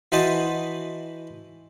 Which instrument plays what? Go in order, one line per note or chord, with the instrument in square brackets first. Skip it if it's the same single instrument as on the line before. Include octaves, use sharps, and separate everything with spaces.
[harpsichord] E3 F#4 C5 D#5 A5 B5